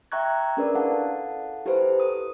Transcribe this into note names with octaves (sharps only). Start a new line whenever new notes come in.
E5 G5 A#5 C#6 F#6 G#6
C#4 D4 G#4 A#4 B4 D5
E4 A4 F5 F#5 A5
E4 G4 A4 B4 C5
D#6